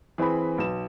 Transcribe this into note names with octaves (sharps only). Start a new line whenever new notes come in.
E3 C4 G#4 B5
B1 E7